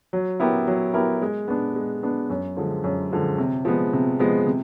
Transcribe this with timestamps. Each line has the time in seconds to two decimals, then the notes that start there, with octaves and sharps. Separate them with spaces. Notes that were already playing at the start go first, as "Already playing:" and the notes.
0.13 F#3
0.40 B3 E4 G4 A#4
0.67 F#3
0.94 B3 E4 G4 A#4
1.22 G#3
1.48 B3 D4
1.76 G#3
2.03 B3 D4
2.30 F#2
2.57 D3 F3 G#3
2.84 F#2
3.12 D3 F3 G#3
3.38 C3
3.65 F3 G#3 B3
3.93 C3
4.19 F3 G#3 B3
4.46 C3